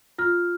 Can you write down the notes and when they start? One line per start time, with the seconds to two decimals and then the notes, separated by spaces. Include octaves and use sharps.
0.18 F4 F6